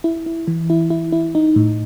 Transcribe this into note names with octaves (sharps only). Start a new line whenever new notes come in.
E4
E4
E3
E4
E4
E4
D#4
A2